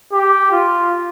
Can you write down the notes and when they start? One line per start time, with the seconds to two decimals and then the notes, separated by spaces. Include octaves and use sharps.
0.12 G4
0.51 F4